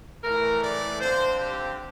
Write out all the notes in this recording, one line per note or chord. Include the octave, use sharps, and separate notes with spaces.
A2 E3 A3 A#4
D5
D3 F3 C4 C5
G4